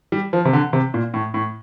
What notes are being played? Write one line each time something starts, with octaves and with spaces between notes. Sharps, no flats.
G3
F3
C3
D3
C3
A#2
A2
A2